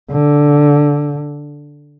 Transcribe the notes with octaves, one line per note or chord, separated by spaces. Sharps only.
D3